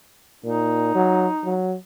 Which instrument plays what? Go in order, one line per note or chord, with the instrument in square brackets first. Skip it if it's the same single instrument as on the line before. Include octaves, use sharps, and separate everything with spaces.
[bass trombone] A#2 [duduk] D#4
[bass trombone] F#3
F#3